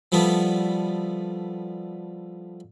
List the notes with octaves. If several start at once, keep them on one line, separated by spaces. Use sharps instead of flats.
F3 G3 A3 B3